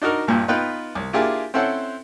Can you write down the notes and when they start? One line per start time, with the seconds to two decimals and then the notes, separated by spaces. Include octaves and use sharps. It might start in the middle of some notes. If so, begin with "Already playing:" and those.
0.02 D4 D#4 F#4 A#4
0.27 A#1 G2 A#2
0.48 B3 D#4 F4 B4 G5
0.95 C2
1.13 A#3 D4 E4 F4 G4 G#4
1.54 C4 C#4 E4 A4 C5 F#5